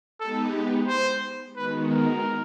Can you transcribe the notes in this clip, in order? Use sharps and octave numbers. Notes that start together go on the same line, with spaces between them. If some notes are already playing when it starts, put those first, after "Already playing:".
G#3 B3 D#4 G4 A4 B4
C5
D#3 G#3 B3 D#4 F#4 B4
A#4